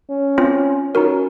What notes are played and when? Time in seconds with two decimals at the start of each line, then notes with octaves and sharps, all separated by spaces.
0.10 C#4
0.38 C4 F4 C5
0.94 C#4 D#4 F#4 A#4